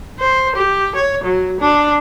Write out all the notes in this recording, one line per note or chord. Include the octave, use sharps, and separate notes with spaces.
C5
G4
C#5
F#3
D4